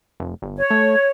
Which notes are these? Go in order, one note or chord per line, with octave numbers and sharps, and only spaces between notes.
F1
G1
C#5
A3